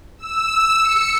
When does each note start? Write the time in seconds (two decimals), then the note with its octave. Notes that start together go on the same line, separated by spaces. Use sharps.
0.18 E6
0.82 C#7